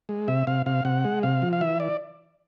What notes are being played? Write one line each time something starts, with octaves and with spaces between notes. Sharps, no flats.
G#3
C3 E5
C3 F5
C3 F5
C3 F#5
G#3
C3 F5
F3
F5
E3 E5
D5